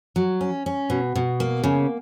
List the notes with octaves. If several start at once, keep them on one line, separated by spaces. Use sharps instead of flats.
F#3
C#4
C#4
B2
B2
A#3
C#3